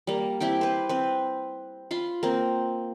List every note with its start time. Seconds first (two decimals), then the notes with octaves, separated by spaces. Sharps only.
0.07 G3 A#3
0.40 C4 E4 G4 G5
0.61 B4 C5
0.89 C4 B4
1.91 F4 B5 C6
2.23 A#3 C4